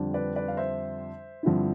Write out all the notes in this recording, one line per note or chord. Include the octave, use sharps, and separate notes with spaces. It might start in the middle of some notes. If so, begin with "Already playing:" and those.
Already playing: F2 D3 G3 D4
B4 D5
B4 D5
F5
C5 E5
G2 D3 F3 C4 E4